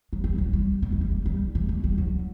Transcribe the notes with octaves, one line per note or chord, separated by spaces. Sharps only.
F#3
G3
G3
F#3
G3
G3
A3
G3
A3
G3
G3
A3
G3
F#3